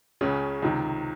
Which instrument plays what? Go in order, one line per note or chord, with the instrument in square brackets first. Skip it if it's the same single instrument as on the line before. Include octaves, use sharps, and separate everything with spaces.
[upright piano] C#2 C#3 C#4
C#2 C3 D#3